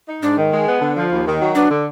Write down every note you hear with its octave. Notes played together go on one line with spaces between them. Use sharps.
D#4
G#2 D4
D#3
G#3
B3
D3
F3
D#2
D#3
F#3
B3 D4
D3